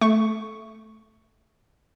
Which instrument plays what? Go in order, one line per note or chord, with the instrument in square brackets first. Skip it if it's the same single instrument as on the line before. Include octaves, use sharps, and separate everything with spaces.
[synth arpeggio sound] A3 C#6